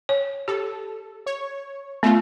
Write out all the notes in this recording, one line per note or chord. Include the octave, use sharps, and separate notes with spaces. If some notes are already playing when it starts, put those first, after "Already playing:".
C#5
G4 A4
C#5
A3 B3 F4